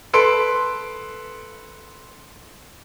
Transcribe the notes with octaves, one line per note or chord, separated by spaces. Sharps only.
A4 B4 C6 D7